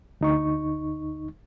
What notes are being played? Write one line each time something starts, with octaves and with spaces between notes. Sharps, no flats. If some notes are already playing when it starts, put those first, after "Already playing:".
D2 D#4 C#6